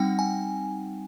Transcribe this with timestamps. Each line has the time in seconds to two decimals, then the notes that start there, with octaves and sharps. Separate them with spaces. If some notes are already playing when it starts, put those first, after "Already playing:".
Already playing: G3 C4 D#4 F#5 G5
0.19 G#5